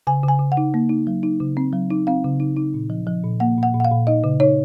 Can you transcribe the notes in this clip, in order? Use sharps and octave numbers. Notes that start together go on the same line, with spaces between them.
C#3 G#5
C#3 G#5
C#3
F#5
D#4
A#3
D#4
F#3
D#4
C#3
C4
F#3
D#4
C4 F5
C#3
D#4
D#4
A#2
F3
F3
A#2
A#3 F#5
A#2
F#5
A#2
F#5
F5
A#2
D#4 D#5
C#3
D#4 C#5